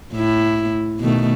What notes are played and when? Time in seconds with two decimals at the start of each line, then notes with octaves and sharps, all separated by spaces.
0.13 A2 E4
1.00 B2 D#3 A3